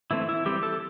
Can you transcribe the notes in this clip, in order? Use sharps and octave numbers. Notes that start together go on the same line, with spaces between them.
E3 A3 C4 E4
E4
E3 G3 C4 G4
A4